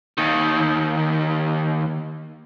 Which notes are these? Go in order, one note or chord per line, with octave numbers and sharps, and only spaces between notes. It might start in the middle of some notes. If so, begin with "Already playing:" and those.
D#2 D#3